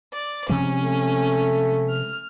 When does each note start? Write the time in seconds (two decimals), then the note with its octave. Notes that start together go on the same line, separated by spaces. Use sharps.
0.13 D5
0.49 C3 F3 G#3 C#4
0.84 A3
1.90 F6